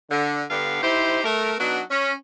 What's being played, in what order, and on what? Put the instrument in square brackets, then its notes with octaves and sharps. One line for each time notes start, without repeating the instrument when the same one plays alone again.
[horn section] D3
G2 D3 B3 D4 F5
D#4 E4 G4 C5
A3 A#4
F#3 B3 D4 D#4 F#4
C#4